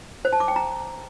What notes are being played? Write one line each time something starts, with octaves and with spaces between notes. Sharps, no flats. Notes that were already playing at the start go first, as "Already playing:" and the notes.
C5
A5
D6
G5
A#5